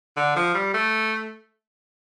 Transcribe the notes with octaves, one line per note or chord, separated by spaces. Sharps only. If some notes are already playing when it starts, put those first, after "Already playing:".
D3
F3
G3
A3